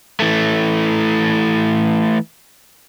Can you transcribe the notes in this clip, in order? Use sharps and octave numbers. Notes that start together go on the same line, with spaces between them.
E3 A3